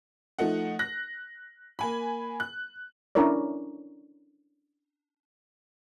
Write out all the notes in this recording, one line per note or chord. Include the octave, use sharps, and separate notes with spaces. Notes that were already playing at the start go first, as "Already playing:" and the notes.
F3 A3 D#4 F#5
F#6 A#6
A#3 G#5 B5
F#6
C#4 D4 E4 A#4 C#5 D5